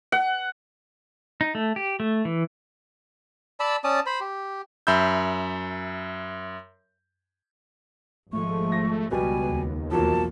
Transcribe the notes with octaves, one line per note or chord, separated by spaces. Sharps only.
F#5
D#4
A3
G4
A3
E3
D5 A5 B5 E6
C#4 D5 A5 D#6
C5 B5
G4
F#2 E5 B5 E6 G6
G#1 F3 G#3 A3 C#6
A#6
C#2 B2 F#3 G3 B3 G#5
D#2
B1 E2 F3 F#3 A#3 A5